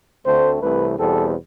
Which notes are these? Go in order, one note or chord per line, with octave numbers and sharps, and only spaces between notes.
D2 D3 A3 C4 C5
C2 C3 E3 A3 B4
E2 B2 G3 C4 A4